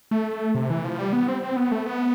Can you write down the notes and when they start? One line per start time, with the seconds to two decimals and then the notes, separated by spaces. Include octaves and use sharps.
0.11 A3
0.55 C3
0.70 E3
0.84 F3
0.99 G3
1.13 B3
1.28 C4
1.43 C4
1.56 B3
1.72 A3
1.86 B3